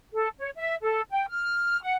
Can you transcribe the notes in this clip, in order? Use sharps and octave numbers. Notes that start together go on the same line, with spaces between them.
A4
C#5
E5
A4
G5
F6
F#5